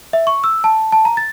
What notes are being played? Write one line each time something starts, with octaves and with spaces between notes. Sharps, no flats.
E5
C#6
E6
A5
A5
A#5
A6